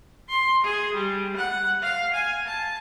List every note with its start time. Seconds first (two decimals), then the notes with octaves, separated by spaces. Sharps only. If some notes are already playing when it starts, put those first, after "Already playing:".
0.29 C6
0.64 G#4
0.94 G3
1.36 F#5
1.82 F5
2.14 G#5
2.47 A5